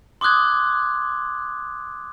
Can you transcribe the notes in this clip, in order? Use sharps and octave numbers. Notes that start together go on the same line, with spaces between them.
C6 D6 D#6 F#6 G#6